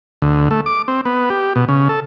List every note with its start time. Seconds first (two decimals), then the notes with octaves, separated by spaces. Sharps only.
0.22 D2
0.51 A3
0.66 D6
0.88 C4
1.05 B3
1.30 G4
1.56 B2
1.68 C#3
1.89 A4